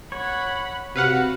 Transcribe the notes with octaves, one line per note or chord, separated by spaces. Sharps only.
C#5 F#5 B5
C3 F#4 B4 F5 F#5